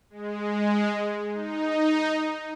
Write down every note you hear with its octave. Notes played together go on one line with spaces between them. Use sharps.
G#3
D#4